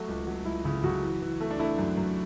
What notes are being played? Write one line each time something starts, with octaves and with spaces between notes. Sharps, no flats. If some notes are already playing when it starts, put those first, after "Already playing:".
Already playing: F#3 A3 F#4
C#2
F#3
C#2 E4
C#3 E4
C#3 F#3 F#4
E3
E3
A3
D4
A3 E4
F#2
F#2